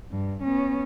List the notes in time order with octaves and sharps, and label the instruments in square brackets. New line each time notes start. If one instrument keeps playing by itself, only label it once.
[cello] G2
B3 C#4